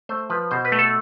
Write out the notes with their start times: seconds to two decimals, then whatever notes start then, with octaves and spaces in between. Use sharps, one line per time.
0.09 A3 C5
0.30 F3 B4
0.51 B2 C5
0.65 B4
0.72 A3
0.79 A4